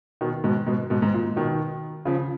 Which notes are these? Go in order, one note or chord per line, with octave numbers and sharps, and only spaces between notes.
B2 D#3
G#2 B2
G#2 B2
G#2 B2
G#2
A#2
B2 D#3
C#3 F3